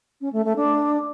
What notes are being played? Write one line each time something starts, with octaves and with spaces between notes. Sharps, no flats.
C#4
A3
A3
D4